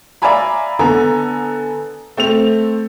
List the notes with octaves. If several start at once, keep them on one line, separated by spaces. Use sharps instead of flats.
D5 E5 F5 G#5 A#5 B5
D3 B3 A4 G#5 A#5
A3 C4 A4 F7